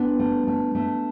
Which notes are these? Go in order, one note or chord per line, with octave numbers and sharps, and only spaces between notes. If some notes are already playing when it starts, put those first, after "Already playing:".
Already playing: B3 D4
A3
A3
A3